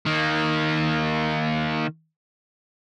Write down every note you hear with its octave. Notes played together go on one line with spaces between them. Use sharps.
D#3 A#3